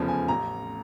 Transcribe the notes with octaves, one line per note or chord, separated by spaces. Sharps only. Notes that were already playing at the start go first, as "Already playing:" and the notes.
Already playing: F1 E2 C#3 F3 A5
G#5
A1 A#5